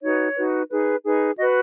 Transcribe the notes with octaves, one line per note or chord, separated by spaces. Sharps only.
D#4 F#4 B4 C#5
D#4 F#4 B4
D#4 G#4 B4
D#4 G#4 B4
F#4 B4 D#5